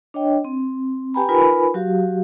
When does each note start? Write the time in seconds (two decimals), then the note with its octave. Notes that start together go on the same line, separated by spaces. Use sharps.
0.14 D4 C#5 D#5 G5
0.44 C4
1.14 G4 B4 G5 G#5 A#5 B5
1.29 D#4 F4 A#4 B4 G#5 B5
1.74 F#3 F#4 G4 F5